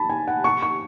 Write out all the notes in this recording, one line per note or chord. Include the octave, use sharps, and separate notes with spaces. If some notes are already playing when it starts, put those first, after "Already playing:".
Already playing: A5 B5
G#5
F#5
C#6
C#6